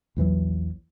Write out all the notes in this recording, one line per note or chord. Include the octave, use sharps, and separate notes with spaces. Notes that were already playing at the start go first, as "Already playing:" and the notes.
A#1 E2 E3 F#3